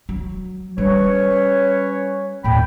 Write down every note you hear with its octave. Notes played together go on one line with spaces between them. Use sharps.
F#3
G3 C#4 B4 C#5
D#2 A2 G5 B5